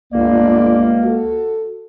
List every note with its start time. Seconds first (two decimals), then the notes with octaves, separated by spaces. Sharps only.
0.13 G1 C#2 A#3 D5
1.04 F#4 A4